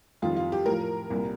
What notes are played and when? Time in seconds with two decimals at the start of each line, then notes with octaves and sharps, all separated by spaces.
0.22 F2 D#3 G3 F4
0.37 F4
0.52 G4
0.66 A2 F3 A#4
1.10 C2 A#2 G3